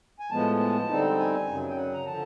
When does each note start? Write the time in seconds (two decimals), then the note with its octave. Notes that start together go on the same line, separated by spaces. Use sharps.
0.20 G#5
0.31 A2 F3 G#3 B3 A5
0.59 A5
0.89 D3 G3 C4 D#4
1.18 G#5
1.47 F#2 C#3 F#3
1.69 G5
1.77 F#5
1.94 A#5
2.06 D3 F3 A5